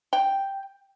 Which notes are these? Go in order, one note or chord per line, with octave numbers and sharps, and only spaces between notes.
G5